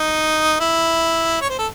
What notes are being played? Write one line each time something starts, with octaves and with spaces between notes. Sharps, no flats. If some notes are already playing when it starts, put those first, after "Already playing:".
Already playing: D#4
E4
C#5
C5
A4